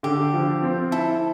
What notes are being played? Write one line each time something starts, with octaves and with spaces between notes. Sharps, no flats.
D3 G4
F3
C4
E4 A4